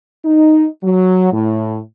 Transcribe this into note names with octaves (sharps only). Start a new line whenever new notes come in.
D#4
F#3
A2